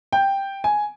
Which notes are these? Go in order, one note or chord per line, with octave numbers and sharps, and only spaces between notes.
G5
G#5